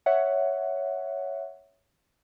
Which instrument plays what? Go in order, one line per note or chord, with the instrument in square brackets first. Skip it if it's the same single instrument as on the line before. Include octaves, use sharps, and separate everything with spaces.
[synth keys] C#5 E5 F#5